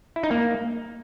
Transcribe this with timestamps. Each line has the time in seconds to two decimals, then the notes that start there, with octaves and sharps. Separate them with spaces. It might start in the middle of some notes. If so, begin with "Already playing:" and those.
0.16 E4
0.23 D#4
0.31 A#3